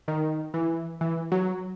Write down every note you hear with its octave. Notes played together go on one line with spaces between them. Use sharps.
D#3
E3
E3
F#3